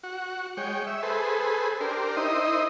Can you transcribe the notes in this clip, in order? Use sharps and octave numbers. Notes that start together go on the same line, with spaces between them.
F#4
G#3 C#5 G5
E5
G#4 A4 B4 C5
D4 G4 A#4 C5
D#4 E4 C5 D#5